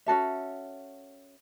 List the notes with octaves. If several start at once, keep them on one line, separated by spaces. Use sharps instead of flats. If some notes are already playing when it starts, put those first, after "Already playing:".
C#4 F#4 A4 E5